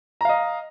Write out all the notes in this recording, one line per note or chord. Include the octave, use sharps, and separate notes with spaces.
D#5 F5 A#5